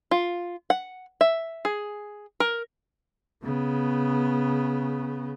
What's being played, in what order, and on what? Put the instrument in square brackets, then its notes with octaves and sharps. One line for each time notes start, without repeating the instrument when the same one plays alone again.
[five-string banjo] F4
F#5
E5
G#4
A#4
[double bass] C#3 B3